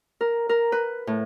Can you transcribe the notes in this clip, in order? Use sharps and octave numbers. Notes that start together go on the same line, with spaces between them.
A#4
A#4
B4
A2